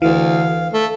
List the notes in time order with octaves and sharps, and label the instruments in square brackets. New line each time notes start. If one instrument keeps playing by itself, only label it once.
[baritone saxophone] D2 [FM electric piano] E3 [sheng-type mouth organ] F5
[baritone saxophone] A3